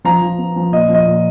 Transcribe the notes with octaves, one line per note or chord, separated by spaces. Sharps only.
F3 A#5
F3
B3
F3
A#2 D#5
F3
D#5
A#2